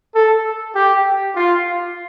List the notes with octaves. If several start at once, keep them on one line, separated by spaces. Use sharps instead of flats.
A4
G4
F4